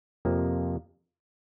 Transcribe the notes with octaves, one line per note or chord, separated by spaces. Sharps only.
F2 C3 F3 A#3